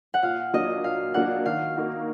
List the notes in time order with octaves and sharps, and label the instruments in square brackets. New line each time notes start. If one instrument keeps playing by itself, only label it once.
[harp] F#5
[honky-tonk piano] A#2 [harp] F5
[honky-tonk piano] F#3 A#3 D4 [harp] D#5
[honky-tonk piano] A#2 [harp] F5
[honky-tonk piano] F#3 A#3 D4 [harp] F#5
[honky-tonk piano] D#3 [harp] F5
[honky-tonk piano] A#3 D#4 F#4